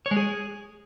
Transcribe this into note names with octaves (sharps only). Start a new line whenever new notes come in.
C#5
G#3
G#4